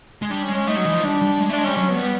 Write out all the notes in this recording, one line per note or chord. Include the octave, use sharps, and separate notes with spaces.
G#3
G3 D4
C#4
G#3
C#4
A3 D#4
F#3
E3
F3
G3 D4
G3
G#3
A3 D4
G#3
C#4
G3
F#3 C#4
B3
G3
B3